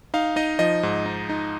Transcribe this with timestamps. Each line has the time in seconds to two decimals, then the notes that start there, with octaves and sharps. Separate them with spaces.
0.14 D#4 F5
0.36 D#4 D#5
0.59 F3 D#5
0.83 G#2
1.06 D#4
1.29 D#4